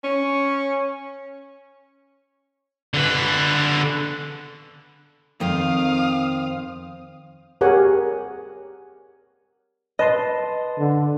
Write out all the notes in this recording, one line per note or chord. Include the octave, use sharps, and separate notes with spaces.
C#4
D3 B4
F2 D#3 C4 F5 D#6
G4 G#4 A#4 C#5 F#5 G#5
B4 D#5 A5 C6
D3